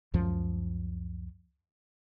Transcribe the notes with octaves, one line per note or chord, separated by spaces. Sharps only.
C#2 F#2 F3